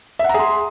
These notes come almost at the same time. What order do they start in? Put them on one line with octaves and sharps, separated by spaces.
E5 F#5 A#5 G#4 C6